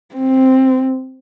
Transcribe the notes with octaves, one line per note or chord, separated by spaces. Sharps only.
C4